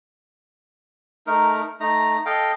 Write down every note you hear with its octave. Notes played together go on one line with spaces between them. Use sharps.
A3 D#4 A#4
A3 D#4 A#5
A4 D#5 F5 G5